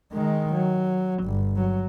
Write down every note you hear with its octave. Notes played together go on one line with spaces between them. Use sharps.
D#3 G#3
F#3
G1
F#3